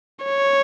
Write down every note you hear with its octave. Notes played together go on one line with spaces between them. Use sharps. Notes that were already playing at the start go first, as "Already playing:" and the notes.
C#5